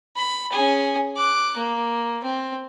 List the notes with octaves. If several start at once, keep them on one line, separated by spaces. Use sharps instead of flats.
B5
C#4 G#4
D6 F#6
A#3
C4